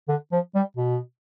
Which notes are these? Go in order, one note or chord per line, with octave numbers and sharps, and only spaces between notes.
D3
F3
G3
B2